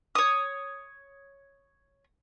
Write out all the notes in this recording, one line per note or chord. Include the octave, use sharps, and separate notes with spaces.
C#5 D#6